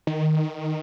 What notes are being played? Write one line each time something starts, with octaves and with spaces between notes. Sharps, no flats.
D#3